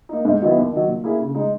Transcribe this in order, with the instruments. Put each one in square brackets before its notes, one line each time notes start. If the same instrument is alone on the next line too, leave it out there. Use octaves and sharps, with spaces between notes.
[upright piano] A#3 D#4
G#2
D#3 F#3 B3 E4
D#2
D#3 F#3
A#2
A#3 E4 G#4
C#3
G#3 D#4